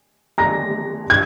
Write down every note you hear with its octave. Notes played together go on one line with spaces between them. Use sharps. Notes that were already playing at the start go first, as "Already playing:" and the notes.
A#5 A#6
G#6